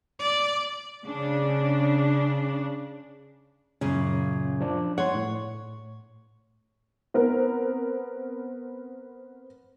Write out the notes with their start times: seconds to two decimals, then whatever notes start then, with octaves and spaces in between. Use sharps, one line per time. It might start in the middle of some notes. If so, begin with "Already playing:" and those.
0.19 D5
1.06 C#3 D4
3.81 F#2 A#2 C#3 C#4
4.61 F3 D4
4.98 C#5 F#5 C6
5.15 A2
7.14 B3 C4 A#4